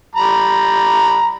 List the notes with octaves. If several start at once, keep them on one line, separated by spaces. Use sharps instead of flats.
G3 A#5 B5